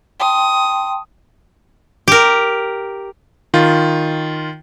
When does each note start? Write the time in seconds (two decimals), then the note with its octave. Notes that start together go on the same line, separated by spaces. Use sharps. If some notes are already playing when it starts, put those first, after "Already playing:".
0.20 G5 A5 C6 D#6
2.08 G4 A#4
3.54 D#3 F4